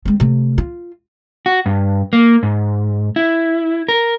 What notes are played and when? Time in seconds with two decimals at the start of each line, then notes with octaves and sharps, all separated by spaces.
0.05 G#3 C4
0.20 C3 A3
0.58 F4
1.46 F#4
1.66 G2
2.13 A#3
2.43 G#2
3.16 E4
3.89 A#4